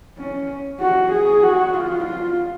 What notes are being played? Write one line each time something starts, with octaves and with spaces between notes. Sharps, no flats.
C#4
F#4
G#4
F#4
F4
F4